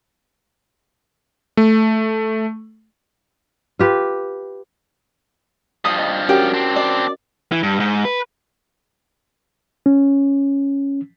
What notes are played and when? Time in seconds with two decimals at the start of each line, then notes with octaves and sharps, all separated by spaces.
1.57 A3
3.79 F4 G4 B4
5.85 G2 F3 D#6
5.99 D#5
6.29 C#4 F#4 G4 A#4
6.54 C4 D4
6.76 D5
7.52 E3
7.63 G2
7.80 G#2
8.05 B4
9.86 C#4